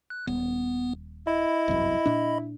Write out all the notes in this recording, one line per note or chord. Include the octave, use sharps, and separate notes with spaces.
F#6
D#1 B3
E4 D#5 B5
G1 C2 F#2
A#2 D4